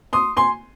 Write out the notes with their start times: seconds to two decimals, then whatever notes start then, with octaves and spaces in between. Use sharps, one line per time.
0.13 C6 D#6
0.37 G#5 C6